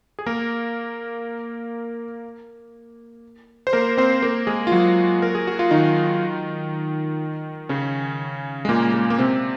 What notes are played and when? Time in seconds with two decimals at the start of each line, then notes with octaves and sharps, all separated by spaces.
0.19 G#4
0.26 A#3 A#4
3.67 C5
3.73 A#3 A#4
3.97 C4 C5
4.22 A#3 A#4
4.47 G#3 G#4
4.67 F4
4.72 F#3 F#4
5.22 A#4
5.35 G#4
5.47 F#4
5.59 F4
5.71 D#3 D#4
7.69 C#3 C#4
8.65 G#3
8.69 A#2 A#3
8.94 G#3
9.10 A#3
9.18 C3 C4